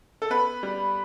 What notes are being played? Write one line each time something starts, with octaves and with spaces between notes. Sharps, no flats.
A4
B3 B4
G3